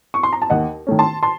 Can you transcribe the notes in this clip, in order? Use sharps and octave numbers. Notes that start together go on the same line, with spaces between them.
C#6
C6
A#5
A5
D#2 D#5 F#5
D#3 A3 C#4
A5 C6
A5 C6